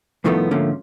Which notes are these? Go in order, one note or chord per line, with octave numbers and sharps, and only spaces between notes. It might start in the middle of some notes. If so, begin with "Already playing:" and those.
C2 A2 D#3 F3 A3 B3
G#2 D3 F3 A3 A#3 C#4